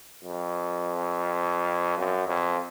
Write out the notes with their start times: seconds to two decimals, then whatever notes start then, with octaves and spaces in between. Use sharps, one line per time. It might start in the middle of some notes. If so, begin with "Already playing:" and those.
0.24 F2
1.98 F#2
2.27 F2